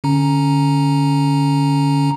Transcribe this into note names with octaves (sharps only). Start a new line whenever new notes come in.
D3 C#4 A#5